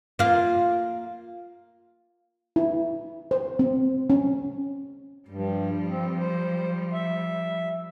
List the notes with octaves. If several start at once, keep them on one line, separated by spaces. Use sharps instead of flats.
A#3 F4
E4
C5
C4
C#4
G2 F3 G3
C4
C5
E5